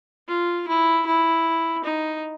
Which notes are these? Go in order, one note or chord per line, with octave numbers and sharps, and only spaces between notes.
F4
E4
E4
D#4